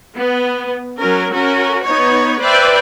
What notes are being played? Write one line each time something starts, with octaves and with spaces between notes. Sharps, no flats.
B3
F#3 C#4 A#4
C#4 F#4 A#4
B3 D#4 C#5
B4 C5 D5 E5 G5